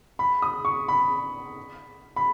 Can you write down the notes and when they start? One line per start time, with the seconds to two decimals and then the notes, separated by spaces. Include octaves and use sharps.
0.19 B5
0.42 D#6
0.65 C#6
0.88 B5
2.16 B5